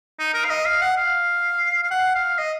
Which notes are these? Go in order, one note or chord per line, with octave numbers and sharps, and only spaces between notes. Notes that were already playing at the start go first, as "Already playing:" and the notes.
D#4
A#4
F5
D#5
F5
F#5
F5
F5
F#5
F5
D#5